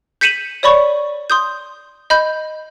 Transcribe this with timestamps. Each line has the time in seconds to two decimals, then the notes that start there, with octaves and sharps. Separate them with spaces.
0.21 G6 B6 C#7 D#7 E7 F#7
0.63 C#5 D5 B5 C#6
1.30 C6 D#6 G6
2.10 D#5 B5 G6